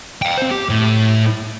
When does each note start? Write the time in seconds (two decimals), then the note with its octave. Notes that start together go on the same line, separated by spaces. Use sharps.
0.22 F5 G5
0.38 C4 C5
0.51 G4
0.69 A2